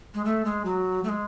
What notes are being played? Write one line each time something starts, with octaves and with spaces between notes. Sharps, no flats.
G#3
A3
G#3
F#3
A3
G#3